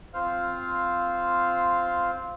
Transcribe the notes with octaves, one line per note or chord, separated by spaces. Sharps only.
C4 F4 C5 F5